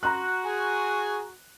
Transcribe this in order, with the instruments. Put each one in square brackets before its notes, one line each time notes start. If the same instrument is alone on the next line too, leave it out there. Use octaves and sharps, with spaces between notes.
[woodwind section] F#4 [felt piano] A#5 C6 F#6
[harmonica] G#4 G#5